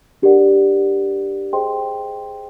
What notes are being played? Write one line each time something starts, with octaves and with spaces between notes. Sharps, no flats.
D4 G4 A#4 D5 F#5
G#4 C5 D#5 G5 C6